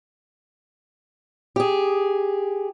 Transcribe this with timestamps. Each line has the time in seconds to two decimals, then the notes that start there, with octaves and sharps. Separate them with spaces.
1.56 G4 G#4